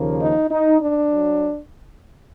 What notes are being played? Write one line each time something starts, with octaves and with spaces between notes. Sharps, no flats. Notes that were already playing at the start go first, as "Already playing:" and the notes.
Already playing: D#2 C#3 F3 A#3
D#4
D#4
D4
F#3